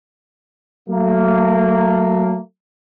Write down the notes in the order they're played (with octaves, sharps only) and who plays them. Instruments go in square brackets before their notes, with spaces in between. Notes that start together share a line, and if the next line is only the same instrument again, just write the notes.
[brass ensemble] F#3 A3 A#3